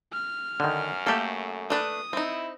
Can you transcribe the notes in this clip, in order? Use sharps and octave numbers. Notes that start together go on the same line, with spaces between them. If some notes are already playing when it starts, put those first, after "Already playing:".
F6
F#2 D3 D#3
A3 A#3 G4 A4
A3 D4 B4 D#6
C4 D#4 E4